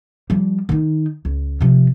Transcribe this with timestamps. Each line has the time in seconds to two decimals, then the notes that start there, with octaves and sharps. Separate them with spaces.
0.30 F3 G3
0.69 D#3 D#4
1.25 C#2
1.61 C3 F3